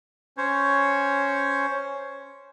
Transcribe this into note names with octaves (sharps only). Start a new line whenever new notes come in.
C#4 C5 C#5